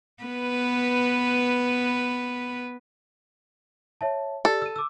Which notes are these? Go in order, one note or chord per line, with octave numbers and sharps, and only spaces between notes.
B3 B4
C#5 E5 A5
G4 A4 D5
E6 D#7
D6 E6